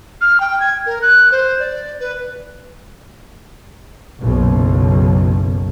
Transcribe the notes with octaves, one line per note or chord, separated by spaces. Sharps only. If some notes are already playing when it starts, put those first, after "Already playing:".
F6
G5
G#6
A#4
F#6
C5
D5
B4
F#1 B1